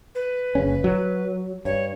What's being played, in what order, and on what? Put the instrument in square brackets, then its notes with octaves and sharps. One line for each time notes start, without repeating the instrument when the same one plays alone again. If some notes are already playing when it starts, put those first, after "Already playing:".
[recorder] B4
[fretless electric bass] F#1 C#3 C#4
F#3
[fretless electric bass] G2 [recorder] C#5